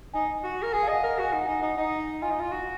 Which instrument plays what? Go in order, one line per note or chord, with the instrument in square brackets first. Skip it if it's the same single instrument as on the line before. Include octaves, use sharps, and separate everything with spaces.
[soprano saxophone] D#4 [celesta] G#5
[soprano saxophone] F#4
A#4
[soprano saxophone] G#4 [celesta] G#5
[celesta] F5
[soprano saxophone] D#5 [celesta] F#5
[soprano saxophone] A#4 [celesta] F5
[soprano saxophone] F#4
[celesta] G#5
[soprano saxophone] D#4 [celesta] F#5
[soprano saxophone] D#4 [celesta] G#5
[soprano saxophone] D#4
D#4
[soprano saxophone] F4 [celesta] G#5
[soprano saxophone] D#4
F4
F#4